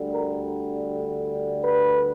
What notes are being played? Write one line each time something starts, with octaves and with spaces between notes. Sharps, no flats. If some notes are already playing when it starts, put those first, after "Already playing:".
Already playing: D2 D3 G3
A#4
B4